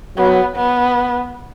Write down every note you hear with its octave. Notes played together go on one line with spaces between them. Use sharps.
F#3 B3
B3